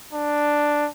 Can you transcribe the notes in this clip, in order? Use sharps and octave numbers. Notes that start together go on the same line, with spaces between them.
D4